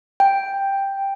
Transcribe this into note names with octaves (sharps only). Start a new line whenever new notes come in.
G5